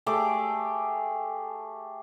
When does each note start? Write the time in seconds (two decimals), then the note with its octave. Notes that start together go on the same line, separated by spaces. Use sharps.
0.06 A3 G4 G#4 D6